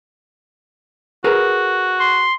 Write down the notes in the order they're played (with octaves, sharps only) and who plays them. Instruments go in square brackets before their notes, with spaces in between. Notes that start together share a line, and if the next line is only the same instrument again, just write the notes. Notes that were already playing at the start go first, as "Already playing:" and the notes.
[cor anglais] F#4 [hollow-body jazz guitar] G#4 A#4 B4
[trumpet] C6